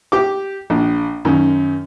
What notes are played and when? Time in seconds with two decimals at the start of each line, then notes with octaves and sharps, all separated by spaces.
0.12 G4 D6
0.70 A#1
1.25 F#2 D#3